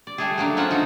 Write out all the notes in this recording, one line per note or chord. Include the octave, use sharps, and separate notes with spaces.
D5
G3 A3 G#4
F#3 A#3 D4
C4 C#4 F4 E5 F#5
D3 D#4 F#4